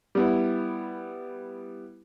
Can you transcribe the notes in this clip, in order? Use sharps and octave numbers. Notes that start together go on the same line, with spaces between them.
G3 B3 E4